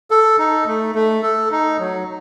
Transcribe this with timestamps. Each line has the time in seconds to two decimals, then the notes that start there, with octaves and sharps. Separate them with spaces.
0.11 A4
0.39 D#4
0.67 A3
0.95 A3
1.23 A4
1.51 D#4
1.79 F#3